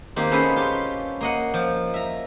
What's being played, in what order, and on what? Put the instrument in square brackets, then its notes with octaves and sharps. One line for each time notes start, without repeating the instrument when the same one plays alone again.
[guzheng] D#3 A#3 C4 G4
B3 C#4 G#4 A4 B4 C5
F4 G4
A#3 D#5 F#5
F3
E5 A#5